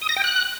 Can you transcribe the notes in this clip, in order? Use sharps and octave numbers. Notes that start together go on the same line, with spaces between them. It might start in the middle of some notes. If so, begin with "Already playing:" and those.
D#6
A#6
G5
F#6